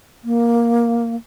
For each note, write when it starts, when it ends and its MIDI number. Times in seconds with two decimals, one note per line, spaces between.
0.24 1.15 58